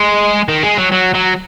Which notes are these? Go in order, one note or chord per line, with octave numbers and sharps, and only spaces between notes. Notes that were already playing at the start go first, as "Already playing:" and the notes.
Already playing: G#3
D#3
G#3
F#3
F#3
F#3